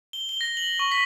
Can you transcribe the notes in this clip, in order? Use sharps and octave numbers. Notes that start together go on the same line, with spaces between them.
G7
G7
A#6
F#7
C#6
B6